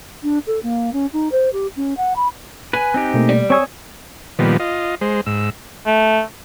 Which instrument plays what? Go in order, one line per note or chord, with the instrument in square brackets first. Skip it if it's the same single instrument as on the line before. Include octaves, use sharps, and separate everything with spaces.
[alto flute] D4
A4
A#3
C#4
D#4
C5
G4
C#4
F#5
B5
[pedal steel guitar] B4 [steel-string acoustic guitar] G#5 [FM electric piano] F#6
[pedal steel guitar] C4 D#4 G4
[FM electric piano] B2 A3 A#3
[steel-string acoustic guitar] G3
[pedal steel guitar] C4 G#5 D#6 [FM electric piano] C#5 C#6 E6
[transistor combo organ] A#2 D#3 F3 G3 B3
F4 D#5
G#3 C5
G#2 E6
[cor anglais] A3